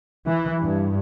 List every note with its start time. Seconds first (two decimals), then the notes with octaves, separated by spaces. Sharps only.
0.27 E3
0.61 G2